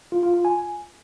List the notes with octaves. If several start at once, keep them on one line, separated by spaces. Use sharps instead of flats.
F4
F4
F4
G#5